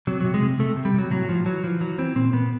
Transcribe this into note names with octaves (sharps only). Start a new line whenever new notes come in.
C3 F#3
C3 F#3
G#3
C3
C3 A3
C3
G3
C3 F#3
A2 F#3
A2 F3
E3 F#3
E3 F3
E3 F#3
E3 C4
A#2 C4
A#2 B3